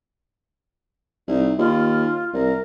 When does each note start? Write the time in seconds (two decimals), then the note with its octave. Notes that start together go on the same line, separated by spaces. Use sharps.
1.28 C2 D#4
1.59 D#2 F4
2.33 C2 A#4